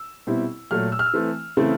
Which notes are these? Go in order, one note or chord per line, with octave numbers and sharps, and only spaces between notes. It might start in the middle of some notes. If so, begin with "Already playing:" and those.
Already playing: E6
B2 G3 C4 E4
A#2 F#3 A3 F6
E6
F6
E6
E3 A3 C4
C#3 E3 A3 C4 E4